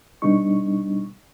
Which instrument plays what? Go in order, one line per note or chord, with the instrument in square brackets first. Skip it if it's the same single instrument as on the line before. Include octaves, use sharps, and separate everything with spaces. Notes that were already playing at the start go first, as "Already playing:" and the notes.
[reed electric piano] B2 G3 B3 D4 D#4 C#6